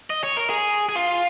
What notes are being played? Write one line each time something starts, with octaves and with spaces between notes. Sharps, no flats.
D#5
C#5
A#4
G#4
G#4
F4